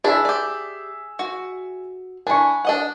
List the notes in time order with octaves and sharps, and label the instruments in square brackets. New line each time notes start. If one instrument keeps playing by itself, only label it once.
[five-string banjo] D4 E4 D5 [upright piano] G#4 E5
[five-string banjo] G4 D5
F#4
[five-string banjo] D4 E4 [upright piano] G#5 C#6
[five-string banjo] D4 D#5 F#5